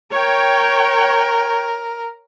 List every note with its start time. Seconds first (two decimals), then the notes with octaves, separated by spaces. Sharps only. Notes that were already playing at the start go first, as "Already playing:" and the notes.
0.14 A#4 C#5 G5